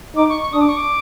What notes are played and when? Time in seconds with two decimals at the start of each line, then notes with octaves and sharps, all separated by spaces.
0.16 D#4 D6
0.29 C#6
0.41 C#6
0.53 D4 D#6
0.61 D6
0.69 C#6
0.77 D6